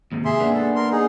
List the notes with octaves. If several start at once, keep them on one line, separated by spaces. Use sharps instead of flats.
D#2 G#2 C3
G#4 E5 C6
A#3 B3 D4
A4
A#4 C6
D#4 G#4